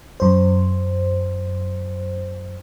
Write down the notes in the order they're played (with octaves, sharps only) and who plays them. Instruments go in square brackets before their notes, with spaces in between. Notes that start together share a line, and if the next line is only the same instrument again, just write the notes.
[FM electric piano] F#2 C5